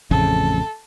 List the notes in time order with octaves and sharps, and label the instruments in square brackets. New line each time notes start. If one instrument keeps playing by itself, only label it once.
[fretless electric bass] A1 F2 C#3 [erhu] A4